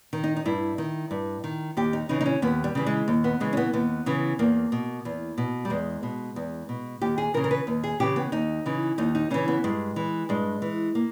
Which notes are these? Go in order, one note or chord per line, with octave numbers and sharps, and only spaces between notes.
D#3
D#4
D#4
G2 E4
D#3
G2
D#3
D#2 G4
D#4
C#3 E3 D#4
D#4
C#4
D#2 B3
G3
C#3 E3
G#3
D#2
B3
C#3 E3 G#3
C#4
B3
D#2 B3
C#3 E3
E2 A#3
B2
E2
B2
G3
E2 G#3
B2
E2
B2
D#2 G4
G#4
C#3 E3 A#4
A#4
B4
D#2
G#4
C#3 E3 G4
B3
D#2 D#4
C#3 E3
D#2 D#4
D#4
C#3 E3 C#4
B3
G2 G#3
E3
G2 G#3
E3
A#3